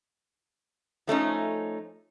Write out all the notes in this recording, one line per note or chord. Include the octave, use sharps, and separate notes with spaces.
F3 A3 C#4 D#4